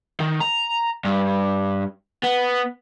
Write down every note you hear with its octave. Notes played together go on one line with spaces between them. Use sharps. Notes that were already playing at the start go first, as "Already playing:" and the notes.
D#3
A#5
G2
B3